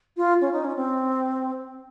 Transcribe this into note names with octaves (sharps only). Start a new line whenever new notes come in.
F4
C#4
D#4
C#4
C4